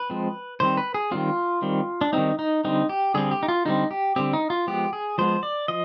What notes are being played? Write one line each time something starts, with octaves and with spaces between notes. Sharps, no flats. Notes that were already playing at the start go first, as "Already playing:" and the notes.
Already playing: B4
F3 G#3 C4
D#3 G3 C4 C5
B4
G#4
D#3 G3 C4 F4
D#3 G3 C4
D4
D#3 G3 C4 D#4
D#4
D3 G3 C4 D#4
G4
D3 G3 C4 G#4
G4
D#4
F4
D3 G3 C4 D#4
G4
D3 G3 C4 G4
D#4
F4
F3 G#3 B3 G4
G#4
F3 G#3 B3 C5
D5
F3 D#5